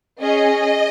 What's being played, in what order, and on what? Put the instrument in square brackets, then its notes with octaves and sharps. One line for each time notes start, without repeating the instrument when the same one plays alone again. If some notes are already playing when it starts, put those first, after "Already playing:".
[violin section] C#4 G#4 D#5